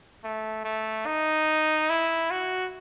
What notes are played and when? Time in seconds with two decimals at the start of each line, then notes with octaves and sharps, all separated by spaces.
0.24 A3
0.65 A3
1.06 D#4
1.90 E4
2.31 F#4